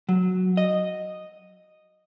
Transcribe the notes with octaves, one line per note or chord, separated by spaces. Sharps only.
F#3
D#5